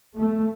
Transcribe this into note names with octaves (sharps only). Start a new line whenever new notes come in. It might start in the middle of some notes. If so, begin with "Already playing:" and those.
A3